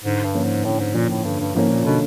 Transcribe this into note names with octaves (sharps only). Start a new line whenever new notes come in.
G#2 D3
G2
F3 A#3 C#4
G#2
A2 D3
G#2
A#2 F3 A#3 C#4
A2
G2 D3
G2
G#2 F3 A#3 C#4
A#2
B2 D3